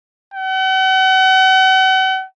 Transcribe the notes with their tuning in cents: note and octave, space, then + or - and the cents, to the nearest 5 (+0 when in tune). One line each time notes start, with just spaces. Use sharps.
F#5 +40